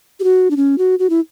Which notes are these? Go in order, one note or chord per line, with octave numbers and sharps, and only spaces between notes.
G4
F#4
D4
C#4
F#4
F#4
E4